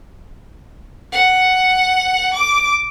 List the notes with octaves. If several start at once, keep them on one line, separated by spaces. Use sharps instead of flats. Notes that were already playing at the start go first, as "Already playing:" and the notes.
F#5
D6